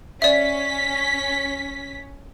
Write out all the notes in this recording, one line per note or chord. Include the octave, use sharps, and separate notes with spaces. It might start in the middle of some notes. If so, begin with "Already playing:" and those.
C#4 D5 E5 B6